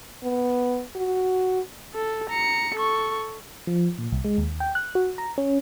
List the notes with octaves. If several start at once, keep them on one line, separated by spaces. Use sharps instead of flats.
B3
F#4
A4
A#5 C#7
A4 C#6
F3
A#2
C2
G#3
D#2
G5
F#6
F#4
A#5
C#4